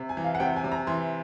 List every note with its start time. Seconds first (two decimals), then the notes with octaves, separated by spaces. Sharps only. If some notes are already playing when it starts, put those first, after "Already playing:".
Already playing: C3
0.09 G#5
0.17 E3
0.24 F5
0.35 F#5
0.40 C3 G5
0.57 G#5
0.64 C3
0.72 A#5
0.87 E3 C6